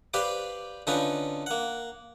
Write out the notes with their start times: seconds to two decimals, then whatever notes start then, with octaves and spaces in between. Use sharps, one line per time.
0.14 G4 B4 C5 D5 F5 G5
0.87 D3 C#4 D#4 F4 B4 C#6
1.46 A#3 F#5